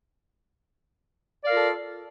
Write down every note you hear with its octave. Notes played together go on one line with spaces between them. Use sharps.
F4 A4 A#4 D5 F5